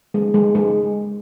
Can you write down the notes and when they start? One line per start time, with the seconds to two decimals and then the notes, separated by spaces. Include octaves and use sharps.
0.14 G#3
0.34 G#3
0.55 G#3